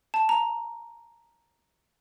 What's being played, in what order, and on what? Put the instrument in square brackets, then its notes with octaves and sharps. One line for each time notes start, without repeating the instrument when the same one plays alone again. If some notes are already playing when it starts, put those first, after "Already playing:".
[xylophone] A5
A#5